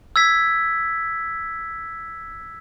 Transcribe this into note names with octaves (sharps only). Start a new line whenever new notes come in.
E6 G#6 B6